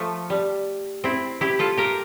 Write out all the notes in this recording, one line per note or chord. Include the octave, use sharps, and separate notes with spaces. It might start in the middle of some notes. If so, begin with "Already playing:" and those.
Already playing: F3 A3
G3
C4 E4
E4 G4
F4 A4
G4 A#4